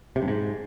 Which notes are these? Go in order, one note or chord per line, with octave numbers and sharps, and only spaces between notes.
C3
G2
G#2